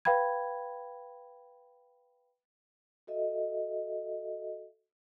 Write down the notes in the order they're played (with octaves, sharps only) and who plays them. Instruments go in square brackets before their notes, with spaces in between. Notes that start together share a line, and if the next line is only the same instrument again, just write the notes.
[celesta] B4 F5 G5 B5 G#6
[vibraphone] F#4 A4 D#5 E5